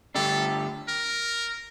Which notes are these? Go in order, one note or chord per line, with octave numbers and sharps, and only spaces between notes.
G2 D3 A3 D4 G4 A4
A#4